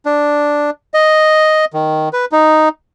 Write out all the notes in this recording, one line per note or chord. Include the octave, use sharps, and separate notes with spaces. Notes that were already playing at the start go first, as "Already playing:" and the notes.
D4
D#5
D#3
B4
D#4